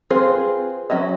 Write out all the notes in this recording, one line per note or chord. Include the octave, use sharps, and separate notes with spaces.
C4 F4 G#4 B4 C5
F#3 C#4 D#5 E5